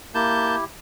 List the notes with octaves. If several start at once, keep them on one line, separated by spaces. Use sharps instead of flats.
A#3 E4 G4 A5 G6